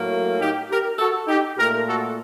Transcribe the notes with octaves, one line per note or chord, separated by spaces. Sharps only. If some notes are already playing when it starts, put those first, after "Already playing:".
Already playing: A2 F#3 A#3
D#4 G4
G4 A#4
F#4 A4
D#4 G4
A#2 A3 G4 A#4
F#4 A4